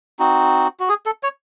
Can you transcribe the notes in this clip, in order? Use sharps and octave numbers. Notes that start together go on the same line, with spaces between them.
C4 D#4 F#4
F#4
G#4
A4
C#5